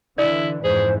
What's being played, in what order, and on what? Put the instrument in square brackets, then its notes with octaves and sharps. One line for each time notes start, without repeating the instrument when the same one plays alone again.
[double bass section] D3 E3 [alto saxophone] E4 [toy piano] D5
[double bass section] F2 G#2 E3 [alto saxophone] G#4 [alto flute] C5